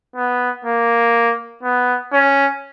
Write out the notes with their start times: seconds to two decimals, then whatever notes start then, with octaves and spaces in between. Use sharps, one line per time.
0.16 B3
0.65 A#3
1.63 B3
2.13 C#4